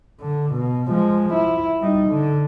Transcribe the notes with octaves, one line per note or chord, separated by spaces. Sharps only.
D3
B2
F3 G#3
E4
G3 D#4
D3